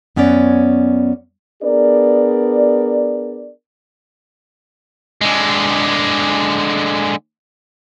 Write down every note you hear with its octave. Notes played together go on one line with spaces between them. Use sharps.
F#2 B3 C#4 C#5 D5
B3 D4 G#4 A#4 D5
D3 G#3